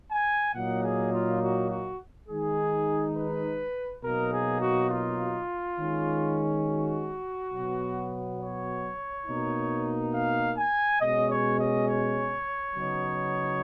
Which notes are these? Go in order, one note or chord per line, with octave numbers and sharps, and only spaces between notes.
G#5
A#2 F#3 A#3 D#4 F#5
G#4
F4
F#4
F#4
D#3 G#3 D#4 G#4
B4
B2 F#3 A#3 D#4 A#4
G#4
F#4
F4
D#3 G#3 C#4
F#4
B2 F#3 B3
C#5
B2 A#3 D#4
F5
G#5
B2 G#3 C#4 D#5
C#5
D#5
C#5
C#3 F#3 B3 D#4